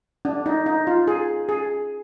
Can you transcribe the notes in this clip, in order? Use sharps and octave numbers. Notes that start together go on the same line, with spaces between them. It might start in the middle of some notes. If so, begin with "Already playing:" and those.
D4
D#4
D#4
F4
G#4
G#4